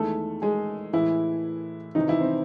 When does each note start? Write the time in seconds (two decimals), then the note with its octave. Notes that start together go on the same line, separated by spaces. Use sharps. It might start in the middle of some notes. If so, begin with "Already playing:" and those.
Already playing: E2 D#3 G#3 A3 A4
0.42 G#3 G#4
0.93 A2 E3 G#3 E4
1.95 E2 C3 D#3 E3 D#4
2.08 E3 E4
2.21 C4 C5